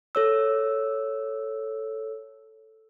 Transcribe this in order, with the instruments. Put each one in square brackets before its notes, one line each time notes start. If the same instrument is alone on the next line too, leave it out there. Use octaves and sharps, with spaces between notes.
[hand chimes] A4 C#5 E6